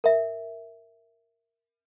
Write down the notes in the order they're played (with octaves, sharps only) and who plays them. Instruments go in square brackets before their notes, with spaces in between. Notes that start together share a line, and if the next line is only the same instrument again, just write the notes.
[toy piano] A#4 E5